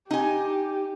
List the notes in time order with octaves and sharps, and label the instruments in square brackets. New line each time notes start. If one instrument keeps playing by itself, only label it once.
[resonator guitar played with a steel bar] D#4 G#5 [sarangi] G4